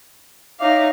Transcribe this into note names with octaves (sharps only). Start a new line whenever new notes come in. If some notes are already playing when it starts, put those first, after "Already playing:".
D#4 C#5 E5 F5 D6